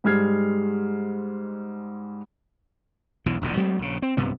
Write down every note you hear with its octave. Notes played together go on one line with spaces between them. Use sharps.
G#2 G3 G#3 F6 G#6 C7
B1 E2 B2 E3
E1 A#1 E2 D3
F#3 G#3 A3 C4
A#1 C#3
C4
B1 G2 C3 B3